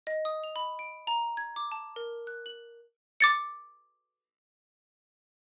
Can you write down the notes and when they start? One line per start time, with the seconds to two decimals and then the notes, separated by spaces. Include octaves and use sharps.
0.07 D#5
0.25 D#6
0.44 F7
0.56 B5
0.79 D7
1.07 A#5
1.37 G#6
1.56 D6
1.72 A5
1.96 A#4
2.27 F#6
2.46 F#7
3.20 D6 A6 C#7